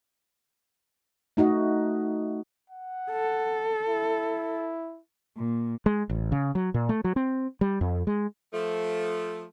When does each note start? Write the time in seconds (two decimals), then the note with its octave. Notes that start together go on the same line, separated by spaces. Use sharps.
1.37 A3 D#4 F#4 D#5
2.70 F#5
3.11 A4
3.89 E4
5.37 A#2
5.86 G#3
6.10 A1
6.32 C#3
6.55 F#3
6.74 A#2
6.89 A3
7.04 F#3
7.16 C4
7.61 G3
7.81 F2
8.07 G#3
8.54 F3 A3